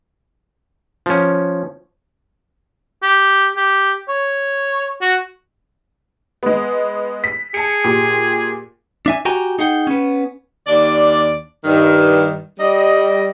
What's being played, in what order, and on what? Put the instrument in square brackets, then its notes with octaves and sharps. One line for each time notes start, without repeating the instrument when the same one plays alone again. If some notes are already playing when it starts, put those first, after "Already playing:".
[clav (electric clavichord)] F3 C#4
[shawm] G4
G4
C#5
F#4
[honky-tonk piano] G#3 B3
B6
[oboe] G#4 [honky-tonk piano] A5 C#7
[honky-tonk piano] A#2 G4
[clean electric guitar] D4 E5 G#5
F#4 G4 G5 G#5 A#5
D#4 G#4 F#5 G5
B3 C#4
[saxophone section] D#2 D4 D5
G2 D#3
G3 D#5